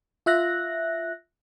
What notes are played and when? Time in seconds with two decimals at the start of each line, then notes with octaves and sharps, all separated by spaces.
0.26 F4 E5 F#6 A#6